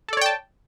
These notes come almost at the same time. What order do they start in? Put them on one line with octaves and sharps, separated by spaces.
A4 D5 C#5 G5 A5